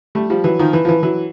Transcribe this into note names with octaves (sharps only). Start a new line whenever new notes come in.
G3 A3
F3 G3
E3 F#3
D#3 F3
E3
F3
E3
E3 F#3